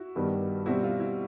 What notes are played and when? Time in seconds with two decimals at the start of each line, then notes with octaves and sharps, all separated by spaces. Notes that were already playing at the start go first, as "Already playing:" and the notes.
Already playing: E4 F#4
0.16 G2 D#3 G3 B3
0.66 B2 G3 C4 E4 F#4
0.83 F4
1.00 E4